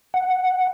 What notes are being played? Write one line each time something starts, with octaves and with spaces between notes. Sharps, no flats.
F#5